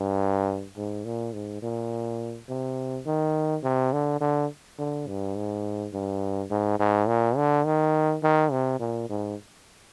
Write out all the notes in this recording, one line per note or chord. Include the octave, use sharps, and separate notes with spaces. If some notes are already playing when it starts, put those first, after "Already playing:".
Already playing: G2
G#2
A#2
G#2
A#2
C3
D#3
C3
D3
D3
D3
G2
G#2
G2
G#2
G#2
A#2
D3
D#3
D#3
C3
A#2
G#2